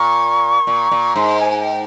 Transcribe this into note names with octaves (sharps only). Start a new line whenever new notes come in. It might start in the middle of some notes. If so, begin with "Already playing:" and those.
Already playing: A#2 C#6
A#2
A#2
G#2 C6
G#5
G5